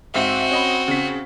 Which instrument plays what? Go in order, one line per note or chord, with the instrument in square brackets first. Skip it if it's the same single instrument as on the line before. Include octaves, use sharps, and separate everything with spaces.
[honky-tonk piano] G#2 E5 F5 [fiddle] C4 F#4
[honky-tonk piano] C#4 D#5 B5
C#3 B6